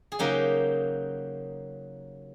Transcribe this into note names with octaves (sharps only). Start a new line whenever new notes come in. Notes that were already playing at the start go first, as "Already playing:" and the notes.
G#4
C#3 F#3 A#3 D#4 G4